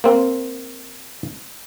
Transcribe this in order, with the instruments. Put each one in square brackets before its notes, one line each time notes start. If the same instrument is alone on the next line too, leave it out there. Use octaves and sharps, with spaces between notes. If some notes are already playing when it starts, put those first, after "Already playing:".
[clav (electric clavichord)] A#3 C4